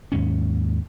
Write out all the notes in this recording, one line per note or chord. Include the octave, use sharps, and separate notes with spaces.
D#2 G#2 C#4